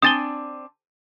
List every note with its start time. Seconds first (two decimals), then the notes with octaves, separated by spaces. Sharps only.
0.02 C4 D4 G#5 D#6 A6 G7